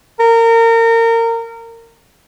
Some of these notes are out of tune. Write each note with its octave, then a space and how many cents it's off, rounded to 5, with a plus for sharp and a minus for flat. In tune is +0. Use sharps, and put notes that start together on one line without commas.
A#4 -25